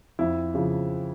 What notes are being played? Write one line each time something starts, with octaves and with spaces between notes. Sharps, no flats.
F2 E4
C#3 F3